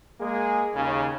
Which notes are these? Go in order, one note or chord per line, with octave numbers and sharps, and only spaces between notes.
G#3 A#3 G#4
D#2 C#3